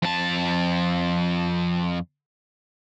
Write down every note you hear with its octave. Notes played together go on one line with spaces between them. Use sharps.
F2 A5